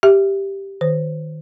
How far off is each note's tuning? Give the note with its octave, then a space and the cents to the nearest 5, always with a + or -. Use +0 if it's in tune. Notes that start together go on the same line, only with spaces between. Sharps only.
G4 +0 E5 +0
D#3 +0 C5 -35